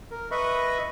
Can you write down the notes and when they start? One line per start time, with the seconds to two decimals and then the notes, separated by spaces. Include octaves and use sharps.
0.11 A#4
0.31 B4 D#5 E5 B5 C#6